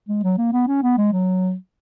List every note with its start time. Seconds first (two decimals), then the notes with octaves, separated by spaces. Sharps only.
0.09 G#3
0.24 F#3
0.38 A#3
0.53 B3
0.68 C#4
0.83 B3
0.98 G#3
1.13 F#3